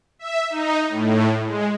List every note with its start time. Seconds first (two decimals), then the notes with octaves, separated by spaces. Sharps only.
0.19 E5
0.50 D#4
0.89 A2
1.46 G#3